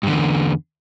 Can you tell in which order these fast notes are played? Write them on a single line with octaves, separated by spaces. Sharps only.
G2 D3 E2